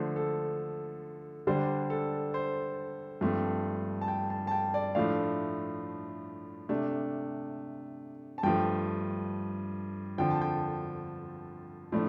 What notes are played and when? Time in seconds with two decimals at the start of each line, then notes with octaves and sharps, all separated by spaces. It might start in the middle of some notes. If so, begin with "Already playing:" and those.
Already playing: D3 F3 A3 C5
0.16 A4
1.47 D3 G3 D4 C5
1.90 A4
2.34 C5
3.21 G2 F3 A3 C4
4.01 A5
4.08 G5
4.30 A5
4.47 A5
4.51 G5
4.74 D5
4.95 A2 F3 A3 D4 F5
6.69 C3 A3 D4
8.38 A5
8.43 G2 F3 A3 G5
10.18 F2 D3 F3 G5
10.30 A5
10.42 G5
11.92 A2 F3 A3 D4